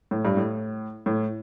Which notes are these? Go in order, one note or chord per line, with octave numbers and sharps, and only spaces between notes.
A2
G2
A2
A2